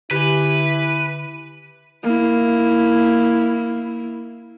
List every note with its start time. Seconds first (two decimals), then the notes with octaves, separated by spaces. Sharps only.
0.11 D3 E4 G4 B4 G#5
2.03 A#3 E4